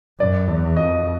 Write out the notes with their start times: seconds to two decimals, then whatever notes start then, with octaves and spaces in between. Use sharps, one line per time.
0.20 F#2 D5
0.48 E2
0.77 F2 D#5